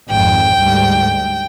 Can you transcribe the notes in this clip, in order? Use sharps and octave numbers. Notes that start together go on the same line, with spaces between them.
G#1 F2 G5
D2 G#2 G3